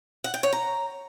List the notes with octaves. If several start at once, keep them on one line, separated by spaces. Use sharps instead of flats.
F#5
G5
C#5
A#5